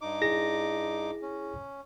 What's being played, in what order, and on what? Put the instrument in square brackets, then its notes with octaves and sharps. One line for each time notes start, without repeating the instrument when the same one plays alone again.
[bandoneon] G2 D#4 D6
[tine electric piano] E4 G#4 A#6
[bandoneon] C#4